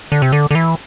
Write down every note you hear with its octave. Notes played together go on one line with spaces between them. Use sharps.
D3
C3
D3
D3
E3